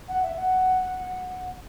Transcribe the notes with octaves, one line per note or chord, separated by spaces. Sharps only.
F#5
E5
F#5